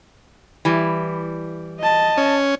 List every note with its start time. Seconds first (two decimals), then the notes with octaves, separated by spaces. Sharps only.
0.65 E3 G3
1.79 D#5 A5
2.17 C#4